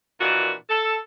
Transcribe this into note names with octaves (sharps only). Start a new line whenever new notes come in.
A#2 D#3 E3 D4 F4 F#4
A4